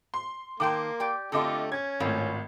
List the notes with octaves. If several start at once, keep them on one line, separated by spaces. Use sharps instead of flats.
C6
D#3 A#3 G5 A5 C6 D6
G4 D5 G5
D3 A3 C4 F4 G4 A4 D#5 D6
C#4 G#6
G#1 A2 A#3 C4 F4